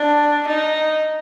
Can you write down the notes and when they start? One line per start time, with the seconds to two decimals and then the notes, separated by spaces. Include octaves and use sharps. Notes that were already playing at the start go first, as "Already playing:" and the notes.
Already playing: D4
0.48 D#4